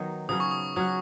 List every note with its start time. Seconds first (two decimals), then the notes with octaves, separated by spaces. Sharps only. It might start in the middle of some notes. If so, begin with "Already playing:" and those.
Already playing: D#3 F#3 B3 D#4
0.29 C#3 F#3 C#4 D#6
0.40 C#6
0.51 D#6
0.76 F#3 C#4 F#4 D#6